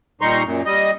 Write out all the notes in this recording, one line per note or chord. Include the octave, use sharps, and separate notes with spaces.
A#2 G3 D#4 A#5 C6 C#6
F#2 A#2
G3 D#5